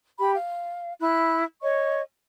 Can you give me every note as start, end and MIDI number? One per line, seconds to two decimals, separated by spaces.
0.19 0.35 67
0.19 0.35 83
0.35 0.93 77
1.00 1.43 64
1.00 1.43 83
1.00 1.43 90
1.61 2.01 73
1.61 2.01 75
1.61 2.01 85